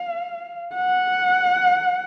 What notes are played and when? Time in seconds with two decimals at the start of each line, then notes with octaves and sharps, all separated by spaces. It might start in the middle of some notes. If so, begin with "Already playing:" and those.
Already playing: F5
0.74 F#5